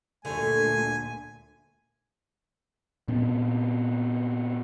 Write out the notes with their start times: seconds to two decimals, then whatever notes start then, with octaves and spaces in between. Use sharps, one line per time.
0.25 D2 A#2 D3 G3 A3 G#5
3.08 A#2 B3 C4